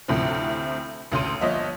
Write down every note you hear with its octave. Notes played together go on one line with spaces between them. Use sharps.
D2 A2 C3 F3
A1 D2 C6 D#7
G1 F3 C#5 D#5 E5